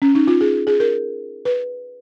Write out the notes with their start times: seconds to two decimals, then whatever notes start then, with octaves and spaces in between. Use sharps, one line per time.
0.02 C#4
0.15 D#4
0.28 F4
0.41 G#4
0.54 G#4
0.67 G#4
0.80 A#4
1.45 B4